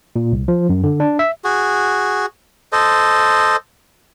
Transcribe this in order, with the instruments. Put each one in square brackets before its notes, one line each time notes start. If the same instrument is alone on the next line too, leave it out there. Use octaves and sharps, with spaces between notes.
[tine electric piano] A#2
C2
F3
F#2
D3
D4
E5
[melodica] F#4 G#4
A4 C5 D#5